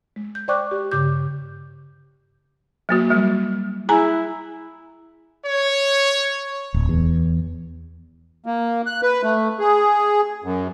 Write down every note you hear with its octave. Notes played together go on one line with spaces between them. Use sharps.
G#3
G6
C5 D5 G5 C#6 D6 F#6
G4
G2 C#3 G4 D6 G6
F#3 A#3 F#4
F#3 G3
E4 G#4 G#5 A#5
C#5
D1
E2
A#3
F#6
B4
A3
G#4
F#2